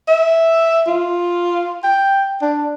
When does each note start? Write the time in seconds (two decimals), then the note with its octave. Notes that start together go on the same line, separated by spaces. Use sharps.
0.08 E5
0.87 F4
1.84 G5
2.42 D4